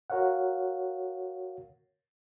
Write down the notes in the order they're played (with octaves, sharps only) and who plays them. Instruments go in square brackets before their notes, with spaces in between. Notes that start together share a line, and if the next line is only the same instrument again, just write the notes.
[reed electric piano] F#4 A#4 C#5 F5 F#5